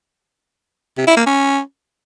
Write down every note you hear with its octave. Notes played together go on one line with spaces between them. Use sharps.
C3
E4
A#3
C#4